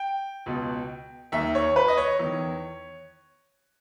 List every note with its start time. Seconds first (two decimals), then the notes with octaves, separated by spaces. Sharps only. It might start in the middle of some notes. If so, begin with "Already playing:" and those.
Already playing: G5
0.46 C#2 B2
1.32 D#2 D#3 E5
1.55 C#5
1.76 B4
1.88 D#5
1.97 C#5
2.19 E2 D#3